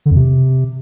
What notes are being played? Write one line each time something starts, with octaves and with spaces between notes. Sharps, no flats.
D3
F2
C3